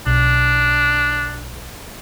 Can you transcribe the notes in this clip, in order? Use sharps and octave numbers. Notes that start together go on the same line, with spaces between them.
B1 D4